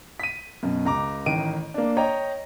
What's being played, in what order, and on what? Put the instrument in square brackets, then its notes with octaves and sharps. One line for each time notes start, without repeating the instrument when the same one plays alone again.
[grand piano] B6 D#7
F#2 B2
C#2 A#5 D6
A1 D#3 D7 D#7
A#3 D4
C#5 D#5 G5 A#5